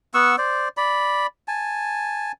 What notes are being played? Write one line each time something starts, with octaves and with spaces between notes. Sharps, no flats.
B3 F#5 C#6 E6
C5 D5
D5 B5
G#5 A5